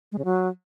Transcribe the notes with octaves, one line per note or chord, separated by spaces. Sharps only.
G#3
C#3
F#3